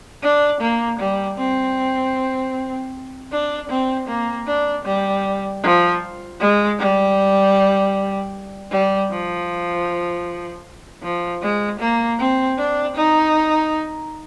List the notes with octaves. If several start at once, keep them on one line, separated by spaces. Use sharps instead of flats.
D4
A#3
G3
C4
D4
C4
A#3
D4
G3
F3
G#3
G3
G3
F3
F3
G#3
A#3
C4
D4
D#4